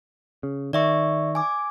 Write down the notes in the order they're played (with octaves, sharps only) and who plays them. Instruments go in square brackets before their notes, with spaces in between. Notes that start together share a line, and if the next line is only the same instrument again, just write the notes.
[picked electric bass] C#3
[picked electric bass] D#3 [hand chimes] D5 E5 C#6
[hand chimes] G#5 D6